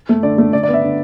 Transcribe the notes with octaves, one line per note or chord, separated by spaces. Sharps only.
A3
D3 D5
A3
D3 D5
D5
B3
E5
D3